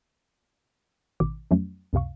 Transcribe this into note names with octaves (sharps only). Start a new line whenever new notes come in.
A1 B2 D#3 D6
F2 F3 F#3 A3 C#4
C#2 F#2 C3 F5 C#6